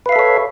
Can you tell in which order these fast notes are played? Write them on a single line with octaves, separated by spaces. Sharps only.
B4 F5 E5 A4 C#5